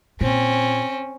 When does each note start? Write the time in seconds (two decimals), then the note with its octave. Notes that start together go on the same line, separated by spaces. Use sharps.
0.21 A#2 C4 C#4